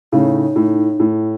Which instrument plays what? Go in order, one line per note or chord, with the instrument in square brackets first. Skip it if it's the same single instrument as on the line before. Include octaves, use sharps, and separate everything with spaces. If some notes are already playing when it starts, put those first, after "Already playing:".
[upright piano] A2 C#3 [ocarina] D#4
[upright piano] A2
A2